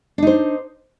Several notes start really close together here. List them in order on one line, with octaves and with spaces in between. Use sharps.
D4 D#4 C5